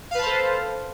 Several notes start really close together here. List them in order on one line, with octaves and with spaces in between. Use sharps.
F5 B4 A5 C5 A4